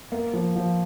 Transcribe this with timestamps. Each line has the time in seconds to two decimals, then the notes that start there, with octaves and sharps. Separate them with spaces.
0.12 A#3
0.33 F3
0.56 F3